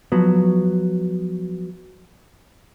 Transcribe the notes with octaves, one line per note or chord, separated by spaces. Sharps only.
F3 F#3 B3